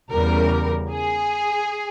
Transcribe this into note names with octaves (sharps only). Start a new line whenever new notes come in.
E2 C#3 G3 A#4
G#4